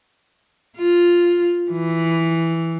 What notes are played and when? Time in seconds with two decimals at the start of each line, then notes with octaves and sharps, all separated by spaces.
0.77 F4
1.71 E3